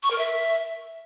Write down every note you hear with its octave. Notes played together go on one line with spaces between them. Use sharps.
C#6
A#4
E5